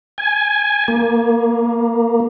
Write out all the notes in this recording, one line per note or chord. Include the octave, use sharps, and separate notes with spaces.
G#5
A#3